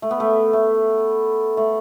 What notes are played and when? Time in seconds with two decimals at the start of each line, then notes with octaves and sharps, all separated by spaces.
0.02 A3
0.11 B3
0.20 A3
0.53 A3
1.57 A3